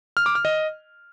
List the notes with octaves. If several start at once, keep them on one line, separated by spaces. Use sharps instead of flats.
F6
D6
F6
D#5